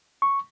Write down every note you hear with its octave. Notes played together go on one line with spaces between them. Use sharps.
C#6